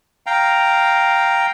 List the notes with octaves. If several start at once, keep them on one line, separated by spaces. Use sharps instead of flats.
F5 G5 A#5